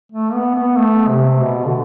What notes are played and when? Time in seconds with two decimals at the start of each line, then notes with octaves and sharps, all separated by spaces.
0.12 A3
0.33 B3
0.55 B3
0.76 A3
1.08 C3
1.41 B2
1.65 D3